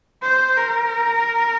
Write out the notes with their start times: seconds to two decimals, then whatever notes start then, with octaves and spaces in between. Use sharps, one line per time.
0.22 C5
0.57 A#4